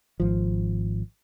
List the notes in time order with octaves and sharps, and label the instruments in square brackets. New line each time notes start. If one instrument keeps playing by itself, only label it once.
[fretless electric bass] G#1 F3